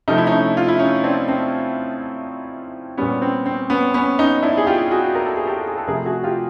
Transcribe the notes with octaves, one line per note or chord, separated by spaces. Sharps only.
C3 F3 A3 D#4
E4
C#4 D#4
F4
E4
C#4 D#4
C4 D4
C4 D4
A#2 G3 B3 C#4
C4
C4
B3 C#4
B3 C#4
C#4 D#4
D4 E4
G#4
F4 G4
F#4 G#4
A#4
A4
G#4
G4 A4
G#4
A4
C3 F3 A3 G#4 A#4
F#4 G#4
F4 G4